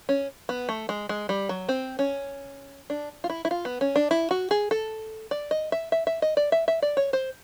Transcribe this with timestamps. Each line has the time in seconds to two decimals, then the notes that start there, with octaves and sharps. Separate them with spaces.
0.09 C#4
0.49 B3
0.69 A3
0.89 G#3
1.09 G#3
1.29 G3
1.49 F#3
1.69 C4
1.99 C#4
2.90 D4
3.24 F4
3.30 E4
3.45 E4
3.51 F4
3.65 B3
3.81 C#4
3.96 D4
4.11 E4
4.31 F#4
4.51 G#4
4.71 A4
5.31 D5
5.51 D#5
5.72 E5
5.92 E5
6.07 E5
6.22 D#5
6.37 D5
6.52 E5
6.68 E5
6.82 D5
6.97 C#5
7.13 C5